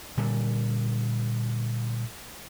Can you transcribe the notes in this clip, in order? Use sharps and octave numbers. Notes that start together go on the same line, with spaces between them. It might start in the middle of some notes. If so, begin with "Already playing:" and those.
A#2 D3 G3